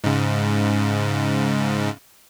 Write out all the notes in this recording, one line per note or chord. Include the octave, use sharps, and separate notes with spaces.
G#2 C#3